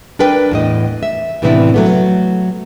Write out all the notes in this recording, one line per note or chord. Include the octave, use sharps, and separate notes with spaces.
D4 A#4 B4 G5
E2 A2 D#5
E5
A2 C3 E3 B3 D4 E4
F#3 A3 B3